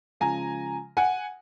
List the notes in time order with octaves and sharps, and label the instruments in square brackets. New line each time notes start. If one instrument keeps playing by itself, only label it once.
[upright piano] C#3 F3 G#3 G#5 A#5
F#5 G#5